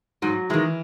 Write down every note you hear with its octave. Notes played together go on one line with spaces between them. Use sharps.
G#2 F#3
D#3 E3 G#3